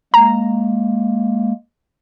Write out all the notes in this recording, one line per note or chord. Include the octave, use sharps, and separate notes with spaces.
G#3 A#3 A#5